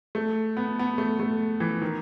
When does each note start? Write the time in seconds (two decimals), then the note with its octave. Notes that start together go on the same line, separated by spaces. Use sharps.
0.15 A3
0.57 B3
0.79 B3
0.98 A3
1.20 A3
1.60 E3
1.82 D#3